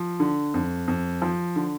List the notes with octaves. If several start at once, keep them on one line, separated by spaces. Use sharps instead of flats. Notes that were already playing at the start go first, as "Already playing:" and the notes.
Already playing: F3
D3
F2
F2
F3
D3